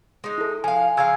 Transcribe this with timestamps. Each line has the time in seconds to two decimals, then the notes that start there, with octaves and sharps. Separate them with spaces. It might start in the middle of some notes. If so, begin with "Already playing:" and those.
0.24 G#3 D#4
0.38 E4 A4
0.64 F3 F5 G#5
0.97 C#3 F3 F5 G#5 E6 G#6